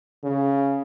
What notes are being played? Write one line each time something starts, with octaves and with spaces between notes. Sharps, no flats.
C#3